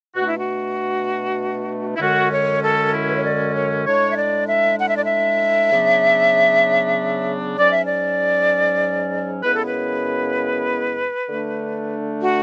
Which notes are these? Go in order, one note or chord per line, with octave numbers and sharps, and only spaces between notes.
B2 A3 D4 F#4
E4
F#4
E4
F#2 D3 G#3 C#4 F#4
C#5
A4
E4
B4
C#5
D5
C#5
A2 G#3 D4 C#5
E5
D5
E5
F#5
E5
D5
E5
C#3 F#3 B3 D4
G#2 F#3 C#4 D5
E5
D5
F#2 C#3 G#3 B3 E4 B4
A4
B4
D3 A3 D4
F#4